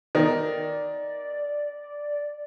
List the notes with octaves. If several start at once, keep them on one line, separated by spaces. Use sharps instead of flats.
D#3 D5